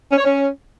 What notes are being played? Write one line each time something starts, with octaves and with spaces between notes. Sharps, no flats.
C#4
C#5
C#4